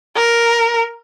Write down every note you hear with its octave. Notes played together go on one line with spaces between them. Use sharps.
A#4